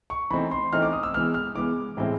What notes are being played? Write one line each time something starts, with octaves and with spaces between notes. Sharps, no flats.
C#6
E3 A3 C4 D#4 B5
C6
E3 A3 C4 D#4 F6
D6
D#6
E6
E3 G#3 B3 F6
F6
E3 G#3 B3 D6
A2 E3 G#3 C4 E4